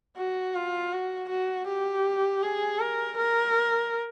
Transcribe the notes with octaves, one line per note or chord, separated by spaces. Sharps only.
F#4
F4
F#4
F#4
G4
G#4
A#4
A#4